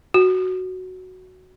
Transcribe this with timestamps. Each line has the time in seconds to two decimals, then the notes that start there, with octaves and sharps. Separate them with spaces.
0.14 F#4